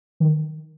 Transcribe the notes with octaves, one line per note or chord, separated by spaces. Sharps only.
D#3